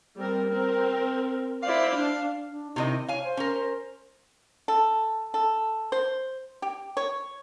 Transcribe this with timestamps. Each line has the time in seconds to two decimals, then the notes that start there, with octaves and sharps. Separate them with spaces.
0.16 G3 C4 A#4
0.48 C4 A#4
1.63 E4 C5 D5 F5
1.95 D4
2.50 D4
2.76 C3 D#3 E4 D#5
3.08 C#5 F5 G#5
3.24 C5
3.37 C#4 A#4
4.68 A4
5.34 A4
5.92 C5
6.62 G4
6.97 C#5